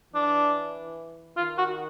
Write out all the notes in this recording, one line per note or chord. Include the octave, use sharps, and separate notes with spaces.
E3 D4
D#3 F4
F#4